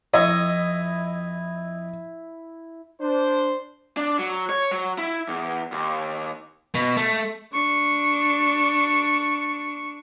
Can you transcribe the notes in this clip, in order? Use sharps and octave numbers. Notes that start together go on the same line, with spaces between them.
F2 C4 E4 D#5 C#6
D4 C5
D4
F#3
C#5
F#3
E4
E2
D#2
B2
A3
D4 C#6